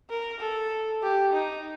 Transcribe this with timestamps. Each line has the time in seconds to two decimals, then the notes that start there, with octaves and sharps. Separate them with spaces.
0.10 A#4
0.40 A4
1.03 G4
1.33 D#4